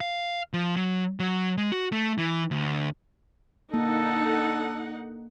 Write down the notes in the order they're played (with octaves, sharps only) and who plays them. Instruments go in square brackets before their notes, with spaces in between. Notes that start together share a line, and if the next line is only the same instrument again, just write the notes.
[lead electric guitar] F5
F3
F#3
F#3
G#3
F#4
A3
E3
D2
[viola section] D3 D#4 F#5 [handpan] A#3 [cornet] A4